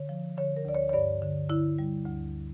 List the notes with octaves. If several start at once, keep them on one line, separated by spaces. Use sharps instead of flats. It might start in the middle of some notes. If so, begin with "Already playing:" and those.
Already playing: D3 C#5
F3
D3 C#5
A#4
D2 D5
C#5
C#5
G2 D5
D3
D3 E4
G3
D2